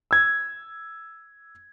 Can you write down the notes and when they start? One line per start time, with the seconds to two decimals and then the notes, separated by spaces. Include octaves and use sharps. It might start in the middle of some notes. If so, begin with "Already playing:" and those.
0.11 E6 G#6